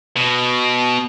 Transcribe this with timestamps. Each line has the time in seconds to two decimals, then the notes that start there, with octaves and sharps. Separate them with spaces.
0.17 B2